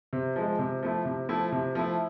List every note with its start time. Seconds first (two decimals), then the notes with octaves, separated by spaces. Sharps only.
0.13 C3
0.36 F3 G#3
0.59 C3
0.83 F3 A3 E4
1.05 C3
1.29 F3 A3 E4
1.52 C3
1.75 F3 A3 E4